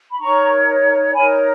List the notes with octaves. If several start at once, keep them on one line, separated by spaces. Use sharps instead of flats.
B5
D#4 A#4 C#5 A#5 C#6
D#4 A#4 C#5 G#5 B5